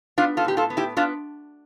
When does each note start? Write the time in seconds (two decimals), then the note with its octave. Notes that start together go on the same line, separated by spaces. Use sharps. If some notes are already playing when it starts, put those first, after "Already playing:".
0.18 B3 D4 F4
0.37 F4 A4
0.45 A2 G4
0.57 F4 A4
0.70 B3
0.77 E4 G4
0.97 B3 D4 F4